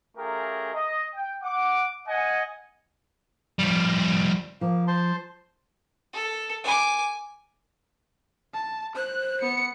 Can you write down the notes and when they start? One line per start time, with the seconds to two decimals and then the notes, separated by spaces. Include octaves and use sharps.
0.17 A3 C#4 F4 G4 G#4 A#4
0.73 D#5
1.14 G5
1.43 F#5 D6
2.08 D#5 F#5 G#5
3.59 F3 G3
4.61 F3 A#3
4.87 C5 A5 C6
6.13 A4
6.64 G#5 D6
8.54 A5
8.96 C5 F#6
9.41 B3 C#7